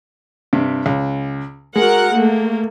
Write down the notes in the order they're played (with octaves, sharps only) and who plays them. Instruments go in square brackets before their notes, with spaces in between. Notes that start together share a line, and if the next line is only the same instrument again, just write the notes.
[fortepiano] G2 C3
C#2
[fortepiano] G#3 [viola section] F#4 A#4 F#5
[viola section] A3 A#3